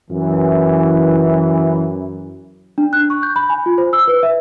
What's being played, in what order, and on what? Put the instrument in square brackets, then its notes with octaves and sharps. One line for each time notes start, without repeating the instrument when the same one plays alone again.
[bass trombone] F#2 [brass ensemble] E3
[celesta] D4
F#6
C#6
G6
B5
G#5
F4
C5
E6
B4
E5